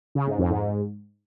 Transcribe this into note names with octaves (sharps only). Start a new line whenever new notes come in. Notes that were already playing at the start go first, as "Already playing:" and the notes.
C#3
G#2
F2
G#2